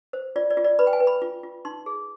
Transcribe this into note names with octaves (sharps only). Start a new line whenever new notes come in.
C5
F4 D5
D5
F4
D5
B4 B5
G5
G#5
B4
B5
F4
F4
D#4 C6
G#4